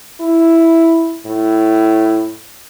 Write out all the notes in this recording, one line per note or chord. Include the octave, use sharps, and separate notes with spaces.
E4
A2